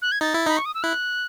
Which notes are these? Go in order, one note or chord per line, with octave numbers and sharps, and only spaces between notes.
F#6
G#6
D#4 A6
E4
D#4 B5
C#6
D#6
E6
E4 F#6